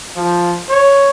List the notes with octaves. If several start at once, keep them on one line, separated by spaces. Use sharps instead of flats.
F3
C#5